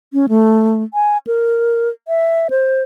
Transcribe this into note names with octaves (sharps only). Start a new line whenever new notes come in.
C#4
A3
G#5
A#4
E5
C5